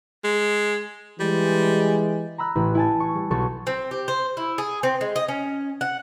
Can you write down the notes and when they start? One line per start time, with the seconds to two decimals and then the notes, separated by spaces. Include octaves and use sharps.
0.24 G#3
1.20 E3 G3 G#3
2.38 A#5 B5 E6 F#6
2.55 A1 E4 B5
2.75 E4 G#5 A5
3.00 C#6
3.15 G3
3.30 B1 A4 C#6
3.67 C4
3.91 G4
4.08 C5
4.37 E4
4.58 G#4
4.83 C4
5.01 G#3
5.16 D#5
5.29 C#4
5.81 F#5